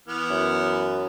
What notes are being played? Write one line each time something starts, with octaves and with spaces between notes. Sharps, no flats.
E3 B3 F6
F#2